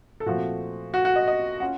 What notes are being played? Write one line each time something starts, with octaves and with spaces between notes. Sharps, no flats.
A4
A#2 F3 A3 C4 F#4
F#4
F#4
D#5
D#5
C#4 F4 F#5